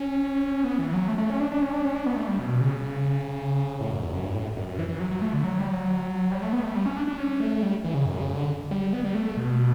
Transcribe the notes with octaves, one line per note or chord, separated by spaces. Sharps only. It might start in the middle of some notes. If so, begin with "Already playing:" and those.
Already playing: C#4
B3
E3
F#3
A3
A3
C#4
D4
D4
C#4
D4
C#4
D4
B3
A3
G3
B2
C#3
A2
F#2
E2
F#2
G2
A2
F#2
F#2
E3
E3
F#3
F#3
A3
D3
F#3
G3
F#3
G3
A3
B3
A3
G3
C#4
D4
D4
C#4
A3
G3
E3
C#3
F#2
C#3
D3
G3
B3
G3
A3
B2